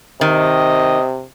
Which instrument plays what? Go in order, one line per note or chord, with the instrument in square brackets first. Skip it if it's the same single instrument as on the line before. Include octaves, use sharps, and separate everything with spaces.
[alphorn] C3 [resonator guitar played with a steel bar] D#3 [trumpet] D#5